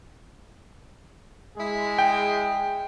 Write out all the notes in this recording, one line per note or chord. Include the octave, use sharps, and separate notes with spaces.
G#3 E4 G#4
G5